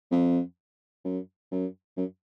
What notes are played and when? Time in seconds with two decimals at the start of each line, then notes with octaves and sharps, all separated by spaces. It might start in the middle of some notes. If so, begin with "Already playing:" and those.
0.12 F2
1.04 F#2
1.52 F#2
1.97 F#2